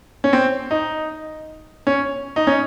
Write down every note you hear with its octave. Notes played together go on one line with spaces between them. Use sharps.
C#4
C4
D#4
C#4
D#4
C#4